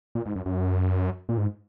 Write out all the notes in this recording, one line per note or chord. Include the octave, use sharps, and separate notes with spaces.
A#2
G#2
F#2
F#2
A#2
G#2